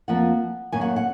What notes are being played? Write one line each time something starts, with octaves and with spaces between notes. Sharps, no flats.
F2 F3 A#3 F#5
F#2 D#3 A#3 G#5
F#5
F#5